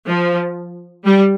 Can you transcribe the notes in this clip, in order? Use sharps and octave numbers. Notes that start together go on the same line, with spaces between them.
F3
G3